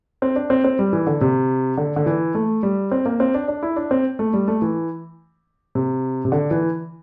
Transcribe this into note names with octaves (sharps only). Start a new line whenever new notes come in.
C4
D4
C4
C4
G3
E3
D3
C3
D3
D3
E3
A3
G3
C4
A#3
C4
D4
D4
E4
D4
C4
A3
G3
A3
E3
C3
C3
D3
E3